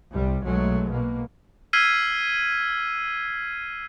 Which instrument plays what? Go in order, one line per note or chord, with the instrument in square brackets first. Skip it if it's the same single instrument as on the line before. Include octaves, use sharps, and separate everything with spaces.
[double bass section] C2 C3 G3
B1 F#3 G#3 A3
B2 A#3
[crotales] E6 F6 G#6 B6 C7 D#7